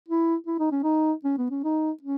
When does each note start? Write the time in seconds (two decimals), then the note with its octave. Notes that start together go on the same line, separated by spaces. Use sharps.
0.08 E4
0.47 E4
0.59 D#4
0.71 C#4
0.83 D#4
1.24 C#4
1.37 B3
1.50 C#4
1.64 D#4
2.02 C#4